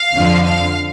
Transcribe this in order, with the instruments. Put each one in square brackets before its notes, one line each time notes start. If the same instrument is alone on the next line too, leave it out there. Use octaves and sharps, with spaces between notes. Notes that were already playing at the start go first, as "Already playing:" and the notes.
Already playing: [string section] F5
F2 D3 F3
F5